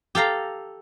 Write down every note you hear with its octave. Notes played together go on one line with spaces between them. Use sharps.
G4 A4 F5 A#5